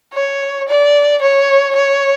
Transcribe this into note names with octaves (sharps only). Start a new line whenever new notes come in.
C#5
D5
C#5
C#5